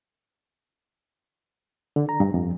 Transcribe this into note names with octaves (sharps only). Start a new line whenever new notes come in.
D3
A#5
G2
F2